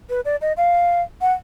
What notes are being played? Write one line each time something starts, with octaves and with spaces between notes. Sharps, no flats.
B4
D5
D#5
F5
F#5